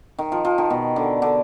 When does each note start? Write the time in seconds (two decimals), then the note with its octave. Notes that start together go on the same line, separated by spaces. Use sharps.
0.18 D#3
0.32 F3
0.45 F3
0.58 D#3
0.70 B2
0.96 D3
1.22 D3